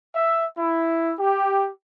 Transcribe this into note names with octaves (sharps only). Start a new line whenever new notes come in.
E5
E4
G4